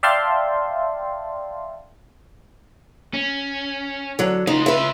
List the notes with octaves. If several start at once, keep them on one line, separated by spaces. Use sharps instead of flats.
D5 E5 F5 G5 A5 C6
C#4
D3 F#3
C#3 D#4 F4
B4 E5